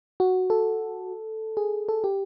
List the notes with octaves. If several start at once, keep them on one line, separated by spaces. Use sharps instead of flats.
F#4
A4
G#4
A4
G4